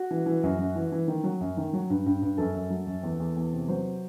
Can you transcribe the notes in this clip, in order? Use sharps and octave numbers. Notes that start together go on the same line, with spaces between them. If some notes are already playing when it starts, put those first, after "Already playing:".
Already playing: F#4
E3
E3
F#2
F#2
E3
E3
D#3
F#3
F#2
D#3
F#3
G2
G2
G2
F#2 A4
F#2
F#3
F#2
E2
E2
E2
C3
F#3 C5